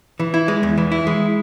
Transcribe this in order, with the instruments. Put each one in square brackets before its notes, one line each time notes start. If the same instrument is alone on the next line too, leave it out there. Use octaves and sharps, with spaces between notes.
[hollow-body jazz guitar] E3
E4
G#3
E2
E3
E4
G#3